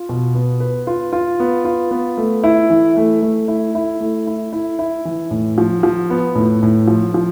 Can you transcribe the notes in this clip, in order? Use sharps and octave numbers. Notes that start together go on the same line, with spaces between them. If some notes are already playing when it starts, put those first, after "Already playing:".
Already playing: F4
B2
B3
B4
F4
F4
B3
F4
B3
A3
E4
E3
A3
A3
E4
E4
A3
E4
E4
E4
E3
A2
F3
F3
B3
A2
A2
F3
F3